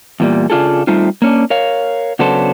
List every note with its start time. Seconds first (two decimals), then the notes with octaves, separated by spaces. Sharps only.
0.20 E2 A#2 G3
0.50 C#3 D4 F4 G#4 A4
0.87 G3 A3 C4 D#4 F4
1.22 A#3 C#4 D4
1.50 A#4 C#5 F5
2.19 C#3 F#3 B3 D4 A4 C5